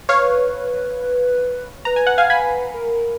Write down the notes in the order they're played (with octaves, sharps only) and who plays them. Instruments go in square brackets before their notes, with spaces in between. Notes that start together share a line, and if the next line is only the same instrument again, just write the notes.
[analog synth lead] B4 [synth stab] C#5 F5
[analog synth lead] B4 [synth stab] A#5
[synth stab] G#5
F#5
F5 G#5
G#5 B5
[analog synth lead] A#4